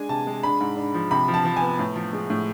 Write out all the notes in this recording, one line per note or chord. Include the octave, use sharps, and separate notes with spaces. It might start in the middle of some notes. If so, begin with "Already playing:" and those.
Already playing: G#3 D4 G#5
C3 A5
G#3
D4 B5
G#2
D4
F3
C3 B5
F3
A5
F3
G#5
B3
A2
F3
G#3
A2